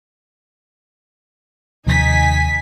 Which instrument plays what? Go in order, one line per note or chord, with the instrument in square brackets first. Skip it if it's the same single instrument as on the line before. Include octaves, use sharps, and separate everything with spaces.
[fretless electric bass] D#2 C3 F3 [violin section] D#4 G#5 B6